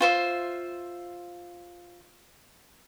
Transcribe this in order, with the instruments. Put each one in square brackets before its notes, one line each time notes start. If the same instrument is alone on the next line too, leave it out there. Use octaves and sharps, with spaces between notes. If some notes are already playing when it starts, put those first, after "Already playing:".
[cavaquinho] F4 C5 E5